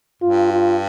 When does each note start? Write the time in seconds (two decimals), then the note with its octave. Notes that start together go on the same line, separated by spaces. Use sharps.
0.22 G2 F4
0.53 F4